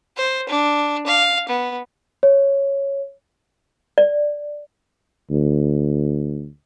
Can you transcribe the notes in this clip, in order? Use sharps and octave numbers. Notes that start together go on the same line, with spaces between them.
C5
D4
F5
B3
C#5
D5
D2